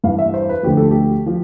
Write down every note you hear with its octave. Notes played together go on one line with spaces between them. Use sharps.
G2 E3 F5
E5
C5
B4
D2 D3 F3 G4
A4
G4
F3